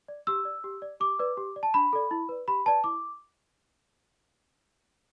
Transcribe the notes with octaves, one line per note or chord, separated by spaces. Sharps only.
D5
G4 E6
D5
G4
D5
G4 D6
B4 D5
G4
D5
A5
D4 B5
A4 D5
E4
B4 D5
G4 B5
B4 D5 A5
E4 D6